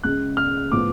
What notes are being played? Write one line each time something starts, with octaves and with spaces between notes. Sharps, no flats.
C#2 C#3 G#3 F#6
F6
A2 F3 B3 D6